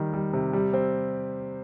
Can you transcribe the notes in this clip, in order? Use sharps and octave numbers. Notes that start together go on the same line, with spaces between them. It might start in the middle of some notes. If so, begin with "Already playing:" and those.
Already playing: D#3 G3
G3
C3
G3
C4